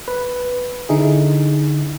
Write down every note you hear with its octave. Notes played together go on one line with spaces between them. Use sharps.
B4
D3 D#4 E4 G#4